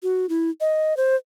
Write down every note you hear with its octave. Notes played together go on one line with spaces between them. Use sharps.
F#4
E4
D#5
C5